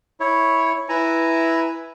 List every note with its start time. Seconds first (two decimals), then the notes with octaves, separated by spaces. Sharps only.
0.20 E4 C#5
0.89 E4 B4 G#5 A#5